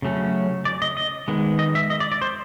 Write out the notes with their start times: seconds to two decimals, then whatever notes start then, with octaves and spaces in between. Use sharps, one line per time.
0.02 C#3 F#3 A3 C#4
0.65 D5
0.82 D#5
0.97 D#5
1.28 D#3 G#3 B3
1.59 D#5
1.75 E5
1.90 D#5
2.00 D5
2.12 D5
2.22 C5